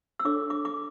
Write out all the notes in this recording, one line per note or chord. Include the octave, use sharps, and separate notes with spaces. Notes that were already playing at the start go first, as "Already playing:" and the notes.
E6
D4 A4 C#5 D6
D6
D6